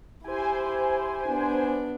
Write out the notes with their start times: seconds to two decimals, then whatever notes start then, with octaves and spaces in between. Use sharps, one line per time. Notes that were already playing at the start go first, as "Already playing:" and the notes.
0.24 E4 G4 C5 G#5
1.27 B3 D4